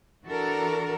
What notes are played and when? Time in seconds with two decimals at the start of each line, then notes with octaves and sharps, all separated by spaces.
0.24 E3 D4 F#4 A4 A#4